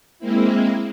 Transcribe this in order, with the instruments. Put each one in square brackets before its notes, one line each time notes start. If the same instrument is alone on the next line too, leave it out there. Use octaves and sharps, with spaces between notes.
[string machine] G#3 A#3 C4 E4